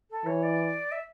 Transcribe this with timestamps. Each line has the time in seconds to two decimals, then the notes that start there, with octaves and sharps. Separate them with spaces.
0.10 A4
0.26 E3 C#5
0.42 D5
0.91 E5